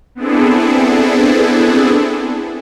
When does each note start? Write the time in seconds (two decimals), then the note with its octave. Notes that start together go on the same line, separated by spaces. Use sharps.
0.15 B3 C4 D4 E4 G#4 A4